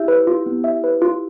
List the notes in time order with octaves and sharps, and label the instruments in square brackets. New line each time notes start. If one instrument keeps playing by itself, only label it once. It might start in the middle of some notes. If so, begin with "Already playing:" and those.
Already playing: [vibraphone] E4 G4 [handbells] E5
[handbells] B4
F4
B3
E5
B4
F4